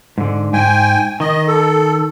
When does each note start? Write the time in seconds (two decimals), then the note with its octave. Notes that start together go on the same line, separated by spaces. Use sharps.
0.18 G#2 D3
0.53 G#2 G5 G#5
1.20 D#3 D#5
1.47 A4